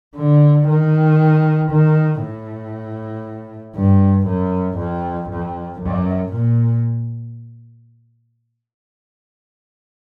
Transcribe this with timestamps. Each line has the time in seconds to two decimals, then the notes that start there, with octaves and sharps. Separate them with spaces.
0.17 D3
0.69 D#3
1.71 D#3
2.23 A2
3.76 G2
4.27 F#2
4.78 F2
5.30 F2
5.81 F#2
6.33 A#2